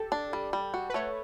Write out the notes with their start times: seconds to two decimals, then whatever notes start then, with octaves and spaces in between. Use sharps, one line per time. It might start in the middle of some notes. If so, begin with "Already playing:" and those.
Already playing: G4 A4
0.12 D4
0.33 G3
0.53 G3
0.74 F#4
0.90 B4
0.94 A3 C#5